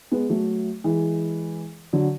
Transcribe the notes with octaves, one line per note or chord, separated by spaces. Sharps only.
G#3 B3
F#3 A3
E3 G#3
D3 F#3